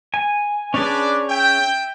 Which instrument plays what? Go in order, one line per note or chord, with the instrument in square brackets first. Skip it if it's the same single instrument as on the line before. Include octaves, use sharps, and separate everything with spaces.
[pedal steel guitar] G#5
[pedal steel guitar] C#4 G#4 [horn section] D4 B4 D5
[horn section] E5 G5